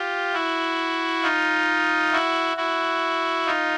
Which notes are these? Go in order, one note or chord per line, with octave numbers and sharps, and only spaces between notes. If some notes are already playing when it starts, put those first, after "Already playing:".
Already playing: F4 G4
E4 F#4
D#4 F4
E4 F#4
E4 F#4
D#4 F4